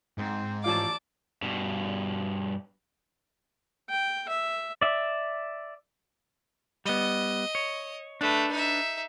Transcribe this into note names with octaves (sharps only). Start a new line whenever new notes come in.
G#2 C4
A1 F3 D5 F5 A5 D6
G2 B2
G5
E5
D5 E5
G3 B3 D#5
C#5
A3 D4 B4
D#4 E5